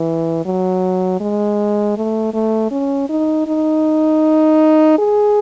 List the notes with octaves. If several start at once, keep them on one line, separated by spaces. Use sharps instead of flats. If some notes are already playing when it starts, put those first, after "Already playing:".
Already playing: E3
F#3
G#3
A3
A3
C#4
D#4
D#4
G#4